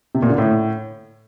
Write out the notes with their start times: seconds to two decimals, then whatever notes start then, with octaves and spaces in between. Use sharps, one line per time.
0.15 C3
0.22 A#2
0.30 D3
0.38 A2